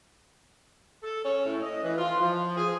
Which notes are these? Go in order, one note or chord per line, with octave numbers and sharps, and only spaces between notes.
A4
C#4
A2
D#5
E3
F4
F3
G#4